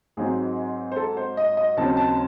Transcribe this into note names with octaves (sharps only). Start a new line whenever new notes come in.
G#1 G#2 F#3 C4 D#4 G#4
C5
A4
C5
D#5
D#5
D#2 C#3 F#3 C4 D#4 A5
A5